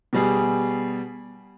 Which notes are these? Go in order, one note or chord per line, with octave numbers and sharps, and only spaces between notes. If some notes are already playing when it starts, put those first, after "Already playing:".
B2 G3 G#4